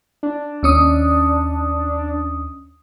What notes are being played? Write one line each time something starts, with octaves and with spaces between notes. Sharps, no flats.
D4
D#2 C#4 D#6